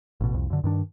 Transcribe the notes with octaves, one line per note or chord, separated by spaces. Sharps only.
A1 B2
C2 F2
F#2 D3
G2 D#3 D4